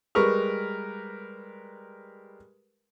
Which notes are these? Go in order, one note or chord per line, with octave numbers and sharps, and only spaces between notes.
G3 G#3 A#4 B4 C#6 F6